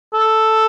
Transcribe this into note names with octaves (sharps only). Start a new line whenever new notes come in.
A4